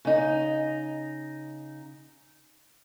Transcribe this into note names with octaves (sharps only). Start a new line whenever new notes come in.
C#3 D#4